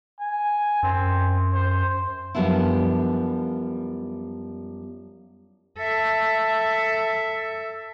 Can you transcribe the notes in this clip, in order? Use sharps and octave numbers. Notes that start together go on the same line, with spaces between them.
G#5
F#2 C4
C5
F#2 F3 G3 B3 D4 E4
A4 E5